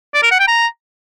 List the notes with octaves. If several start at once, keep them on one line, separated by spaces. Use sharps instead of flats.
D5
A#4
F#5
G5
A#5